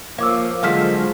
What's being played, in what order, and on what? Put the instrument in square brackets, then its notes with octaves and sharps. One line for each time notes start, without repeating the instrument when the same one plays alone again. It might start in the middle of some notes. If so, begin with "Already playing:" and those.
[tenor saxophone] F3 [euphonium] A#3 [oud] C#5 [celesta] F5 D6 E6
[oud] D3 F3 F#3 [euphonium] G#3 [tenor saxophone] F4 [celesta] F5 F6 B6